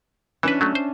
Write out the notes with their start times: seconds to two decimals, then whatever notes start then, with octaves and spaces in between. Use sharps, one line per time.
0.43 E3 C#4 D4 B4 E5
0.61 F#3 A3
0.75 C5